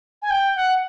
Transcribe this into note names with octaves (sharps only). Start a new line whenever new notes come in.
G#5
G5
F#5